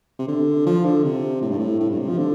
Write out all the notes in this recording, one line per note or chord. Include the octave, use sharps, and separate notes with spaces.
C3
D3
F3
D3
C3
A2
G2
A2
A2
G2
C3
F3
D3